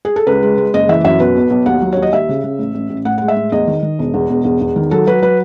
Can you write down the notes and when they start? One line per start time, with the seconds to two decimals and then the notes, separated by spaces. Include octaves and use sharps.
0.05 G#4
0.16 A4
0.27 C#2 B4
0.43 G#3
0.58 G#3
0.74 F#1 D#5
0.89 E3 E5
1.05 F#2 E5
1.20 B2 B4
1.36 B1
1.50 B1
1.66 D#2 F#5
1.81 F#3
1.93 D#2 C#5
2.02 D#5
2.13 D#2 E5
2.29 C#3
2.44 C#3
2.59 A1
2.75 A1
2.90 A1
3.05 A2 F#5
3.18 G#3 F#5
3.28 E5
3.37 A2
3.52 E2 D#5
3.68 D#3
3.83 D#3
3.99 E1
4.14 E2
4.29 E1
4.45 E2
4.61 E2
4.76 D#3
4.91 F#3 A4
5.07 F#3 B4
5.22 F#3 B4